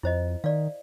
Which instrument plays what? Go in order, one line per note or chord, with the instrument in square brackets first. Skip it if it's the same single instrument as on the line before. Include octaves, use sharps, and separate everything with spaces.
[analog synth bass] F2 [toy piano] E4 C5 D#5
[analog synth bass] D#3 [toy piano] D5 F5